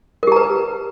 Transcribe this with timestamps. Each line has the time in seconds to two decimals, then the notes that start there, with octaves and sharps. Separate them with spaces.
0.23 A#4
0.27 G4
0.32 A#5
0.36 B4